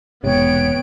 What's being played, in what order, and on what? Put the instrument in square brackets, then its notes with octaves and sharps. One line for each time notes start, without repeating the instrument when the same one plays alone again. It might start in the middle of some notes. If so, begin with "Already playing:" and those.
[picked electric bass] E1 G#2 C3 [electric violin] B3 D7 [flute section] C#5 G5